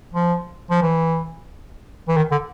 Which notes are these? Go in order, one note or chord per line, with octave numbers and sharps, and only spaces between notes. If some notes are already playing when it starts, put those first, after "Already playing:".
F3
F3
E3
E3
D#3
D3